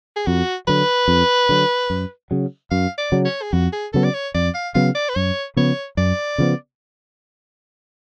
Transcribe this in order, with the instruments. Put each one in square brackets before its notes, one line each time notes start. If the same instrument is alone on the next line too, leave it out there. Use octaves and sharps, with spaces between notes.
[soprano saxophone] G#4
[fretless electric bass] F2 [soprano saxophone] F#4
[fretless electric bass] D3 F#3 [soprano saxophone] B4
[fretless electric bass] F2
D3 F#3
F#2
C#3 F#3
[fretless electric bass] F#2 [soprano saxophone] F5
[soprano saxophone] D5
[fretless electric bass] C#3 F#3
[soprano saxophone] C#5
G#4
[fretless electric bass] F2 [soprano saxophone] F#4
[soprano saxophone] G#4
[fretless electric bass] C#3 F#3 B3 [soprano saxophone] A4
[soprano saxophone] D5
C#5
[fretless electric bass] F2 [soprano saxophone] D5
[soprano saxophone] F5
[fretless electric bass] C#3 F#3 B3 [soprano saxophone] F5
[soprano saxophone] D5
B4
[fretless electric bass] F#2 [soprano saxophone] C#5
[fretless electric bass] C#3 F3 B3 [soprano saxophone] C#5
[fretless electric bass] F#2 [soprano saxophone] D5
[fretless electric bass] C#3 F3 B3